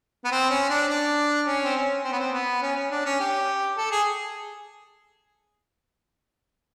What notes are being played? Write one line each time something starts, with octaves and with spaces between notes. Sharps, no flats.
B3
C4
C#4
D4
D4
C#4
C4
C#4
C4
B3
C4
B3
C#4
C#4
D4
C#4
G4
A4
G#4